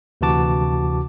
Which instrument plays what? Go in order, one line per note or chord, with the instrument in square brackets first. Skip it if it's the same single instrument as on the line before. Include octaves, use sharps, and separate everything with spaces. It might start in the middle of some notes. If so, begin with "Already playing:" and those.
[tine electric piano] D2 C3 E3 F#4 A5 D6